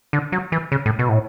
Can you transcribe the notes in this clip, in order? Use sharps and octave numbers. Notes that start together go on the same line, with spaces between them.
D3
F#3
E3
C#3
A2
B2
A2